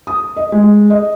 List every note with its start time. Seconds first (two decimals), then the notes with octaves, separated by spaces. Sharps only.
0.07 D#6
0.37 D#5
0.52 G#3
0.90 D#5